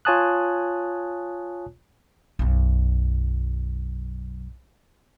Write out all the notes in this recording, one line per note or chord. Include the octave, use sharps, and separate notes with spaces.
F4 C#5 G#5 A5 D#6 F#6
B1 F#2